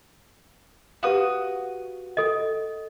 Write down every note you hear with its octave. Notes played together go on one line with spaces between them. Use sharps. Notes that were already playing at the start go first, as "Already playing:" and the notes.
F#4 G4 B4 F5 D#6
A4 D#5